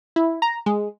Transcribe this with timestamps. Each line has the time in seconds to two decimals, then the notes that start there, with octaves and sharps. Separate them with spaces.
0.16 E4
0.42 A#5
0.66 G#3